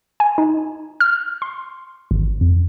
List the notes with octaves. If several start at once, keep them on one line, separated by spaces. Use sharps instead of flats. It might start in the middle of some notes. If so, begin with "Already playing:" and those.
G#5
D#4
F6
C6
G#1
F2